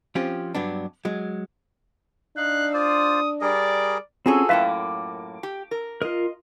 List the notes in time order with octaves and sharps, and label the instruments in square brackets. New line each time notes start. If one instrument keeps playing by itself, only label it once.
[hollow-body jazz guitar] F3 C4 C#4 F4 G4
G2 F#3 B3 D4
F#3 G#3
[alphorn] D4 [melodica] D#4 F5 [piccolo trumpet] F#6
[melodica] F4 C5 D5 [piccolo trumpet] D#6
[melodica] G3 G#4 A#4 [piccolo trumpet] D5
[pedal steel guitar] C4 C#4 [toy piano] F4 [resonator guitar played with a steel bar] F#4 G#4 A4
[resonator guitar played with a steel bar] F#2 A2 A#3 [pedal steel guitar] B4 E5 A5 [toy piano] F5 G5
[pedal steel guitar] D6
[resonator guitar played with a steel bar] G4
A#4
[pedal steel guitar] F4 A#4 [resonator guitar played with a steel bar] D#5